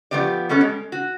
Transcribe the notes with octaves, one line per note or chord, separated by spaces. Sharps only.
F3 A3 B3 G4 D5
G3 B3 C#4 A4
G#3
F#4